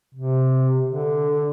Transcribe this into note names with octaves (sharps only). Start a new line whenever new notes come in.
C3
D3